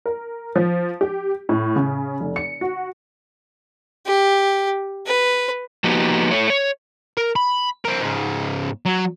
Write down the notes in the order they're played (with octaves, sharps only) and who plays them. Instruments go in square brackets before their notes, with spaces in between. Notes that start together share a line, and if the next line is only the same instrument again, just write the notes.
[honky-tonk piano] A#4
F3
G4
A2
C#3
F1
C#7
F#4
[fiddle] G4
B4
[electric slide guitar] F3 A#3 B3 D#4 F#4 G4
A3 C#5
C#5
[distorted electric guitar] A#4
B5
C4 A#4
G#2 C#3
F#3